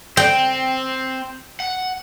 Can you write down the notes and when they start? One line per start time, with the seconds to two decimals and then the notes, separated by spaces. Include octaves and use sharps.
0.17 C4 G5
1.60 F#5